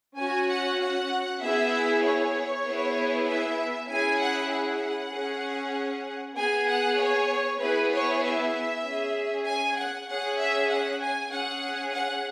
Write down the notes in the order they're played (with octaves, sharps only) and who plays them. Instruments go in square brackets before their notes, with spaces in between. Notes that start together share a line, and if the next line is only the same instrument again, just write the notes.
[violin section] C#4 F#4 G#5
F#5
F#5
B3 E4 G#4 E5
C#5
B3 E4 G#4
E5
C#4 E4 G#4 G#5
F#5
F#5
C#4 G#4
B3 G#4 G#5
F#5
C#5
B3 E4 G#4 B4
C#5
E5
C#4 G#4
G#5
F#5
C#4 G#4 F#5
E5
F#5
G#5
C#4 G#4 F#5
F#5